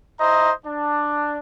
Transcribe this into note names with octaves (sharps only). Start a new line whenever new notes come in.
E4 C5 D#5 A#5
D4